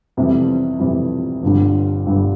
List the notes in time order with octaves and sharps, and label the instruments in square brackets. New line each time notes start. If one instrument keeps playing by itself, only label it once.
[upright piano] F2 C3 E3 G3
F2 C3 E3 G3
G1 G2 D3 G3
G1 G2 D3 G3